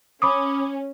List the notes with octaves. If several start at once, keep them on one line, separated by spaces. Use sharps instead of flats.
C#4 B5 D6 D#6